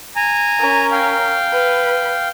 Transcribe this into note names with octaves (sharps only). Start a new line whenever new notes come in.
G#5 A#5
C#4 A#4
F5 G5
B4